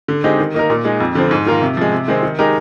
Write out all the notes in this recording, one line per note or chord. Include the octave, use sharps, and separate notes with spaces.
D3
G#3 C4 D#4 G4
D#3
A#3 D#4 A#4
A#2
G#3 D#4
F2
D3 F3 C4
G#2
D#3 A#3 F4 A#4
C3
F3 G#3
C3
D#3 G#3 C4
D#3
G#3 D#4 G4 A#4